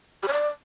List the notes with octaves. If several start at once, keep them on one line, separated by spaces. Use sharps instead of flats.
G4
C#5
D5